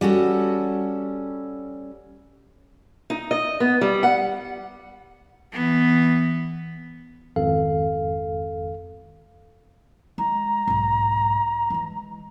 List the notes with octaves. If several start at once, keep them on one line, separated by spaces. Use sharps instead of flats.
G3 C#4 F#4 A4
D#4
D#5
B3
G3
F#5
E3 B3
G#1 F2 A4 F5
G#3 A#5
B1 G#2
E3 G#3